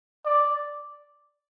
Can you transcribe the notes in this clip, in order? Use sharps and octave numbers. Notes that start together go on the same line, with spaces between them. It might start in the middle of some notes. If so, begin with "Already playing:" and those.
D5